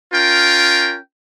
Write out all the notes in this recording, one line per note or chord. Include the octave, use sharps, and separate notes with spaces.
C#4 F4 A#4 G5